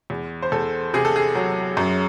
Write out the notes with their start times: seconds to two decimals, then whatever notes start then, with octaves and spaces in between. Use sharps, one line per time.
0.10 E2
0.42 C5
0.52 E2 A4
0.94 C3 G#4
1.05 A4
1.16 G#4
1.35 F#3
1.77 F#2